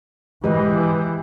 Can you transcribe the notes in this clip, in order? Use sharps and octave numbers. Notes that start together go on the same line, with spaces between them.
G#2 E3 G4 B4 D#5